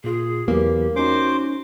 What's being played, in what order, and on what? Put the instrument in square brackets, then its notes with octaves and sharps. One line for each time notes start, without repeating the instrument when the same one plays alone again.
[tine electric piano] A#2 F4 [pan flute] G#4
[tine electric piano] E2 E3 F#3 [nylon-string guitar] A#3 [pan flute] G4
[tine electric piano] C#4 D#4 [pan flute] F#4 [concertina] C5 C6 D6